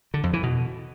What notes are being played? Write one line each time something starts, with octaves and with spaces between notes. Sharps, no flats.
D3
F2
E3
B2